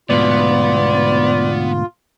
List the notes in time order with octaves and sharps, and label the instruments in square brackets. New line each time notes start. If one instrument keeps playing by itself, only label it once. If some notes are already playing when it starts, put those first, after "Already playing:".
[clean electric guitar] D2 G#2 B2 [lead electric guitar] B3 [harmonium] F4 [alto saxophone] D5